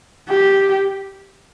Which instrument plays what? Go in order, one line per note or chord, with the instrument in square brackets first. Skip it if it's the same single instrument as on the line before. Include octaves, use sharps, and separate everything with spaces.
[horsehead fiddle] G4